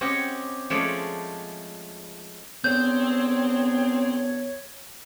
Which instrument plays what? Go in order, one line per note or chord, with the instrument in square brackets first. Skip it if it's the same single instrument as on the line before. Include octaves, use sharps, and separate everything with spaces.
[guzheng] C4 C#4 G4 C#5 D#5 F#5
F3 G#3 A3 C#4 C#5 D5
[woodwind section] E2 D3 B3 [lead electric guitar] C4 [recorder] C#5 [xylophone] G6